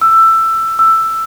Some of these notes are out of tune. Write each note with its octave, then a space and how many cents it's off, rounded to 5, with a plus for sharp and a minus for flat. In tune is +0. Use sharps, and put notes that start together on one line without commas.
E6 +15
E6 +10